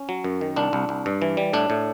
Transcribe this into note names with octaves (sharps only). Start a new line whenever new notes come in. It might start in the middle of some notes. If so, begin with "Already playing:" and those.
Already playing: C#4
F#3
F#2
D#3
C2 D4
C2
C2
G2
E3
G3
A2 D4
A2